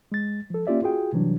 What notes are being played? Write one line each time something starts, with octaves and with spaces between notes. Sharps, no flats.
G#3 A6
F3 A4
A#3 C#4 F4 G4 D5 E5
F4 F#4 G#4 G5
C3 E3 F#3 G3 D4